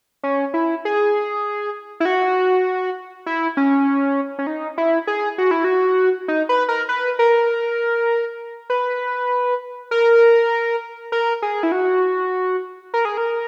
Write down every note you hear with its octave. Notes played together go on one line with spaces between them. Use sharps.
C#4
E4
G#4
E4
F#4
E4
C#4
C#4
D#4
E4
G#4
F#4
E4
F#4
D#4
B4
A#4
B4
A#4
B4
A#4
A#4
G#4
E4
F#4
A#4
G#4
A#4